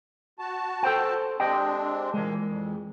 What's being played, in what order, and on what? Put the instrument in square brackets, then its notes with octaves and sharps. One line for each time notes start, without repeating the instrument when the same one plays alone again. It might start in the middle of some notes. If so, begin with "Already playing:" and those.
[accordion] F#4 A5
[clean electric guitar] A4 C5 G5
[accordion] G#3 C4 D4 [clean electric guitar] G4 D#5 G5
[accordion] A#2 A#3 [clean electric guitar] E3 G#3
[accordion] F2